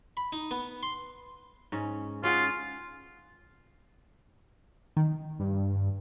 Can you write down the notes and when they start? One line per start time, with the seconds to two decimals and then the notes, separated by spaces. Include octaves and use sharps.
0.17 B5
0.33 D#4
0.51 B3
0.83 C6
1.72 G#2 C#4
2.24 C#4 F4 G#4 F#5
4.97 D#3
5.39 G2